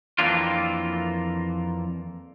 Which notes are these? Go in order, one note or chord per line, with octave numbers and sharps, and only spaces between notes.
F2 E3 A#3 D4 F4